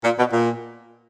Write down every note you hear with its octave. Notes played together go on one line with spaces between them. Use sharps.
A#2
B2
A#2